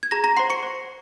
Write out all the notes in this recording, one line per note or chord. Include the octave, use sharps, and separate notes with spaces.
G#6
G#4 A#5 A#6
A#5 A#6
C5 F#5 C6 C7
C#6 C#7
C5